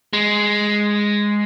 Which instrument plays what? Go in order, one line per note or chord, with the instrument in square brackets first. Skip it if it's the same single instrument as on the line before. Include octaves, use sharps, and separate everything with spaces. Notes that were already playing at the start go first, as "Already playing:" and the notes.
[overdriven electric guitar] G#3